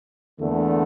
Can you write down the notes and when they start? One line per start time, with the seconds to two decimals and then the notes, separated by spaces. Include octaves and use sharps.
0.39 E2 D3 A3 A#3